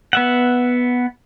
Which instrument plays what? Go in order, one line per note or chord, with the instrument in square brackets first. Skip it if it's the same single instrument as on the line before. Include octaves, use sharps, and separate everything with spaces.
[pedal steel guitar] B3 E5 F#5